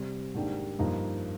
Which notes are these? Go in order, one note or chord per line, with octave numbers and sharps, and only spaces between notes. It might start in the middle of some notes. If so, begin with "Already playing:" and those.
Already playing: C3 G3 C4
G#2 D#3 A#3 D4 G4
G2 F3 A#3 D#4